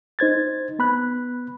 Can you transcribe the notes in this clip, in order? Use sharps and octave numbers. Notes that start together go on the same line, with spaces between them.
D#4 C5 G#6 A6
B3 B5 F#6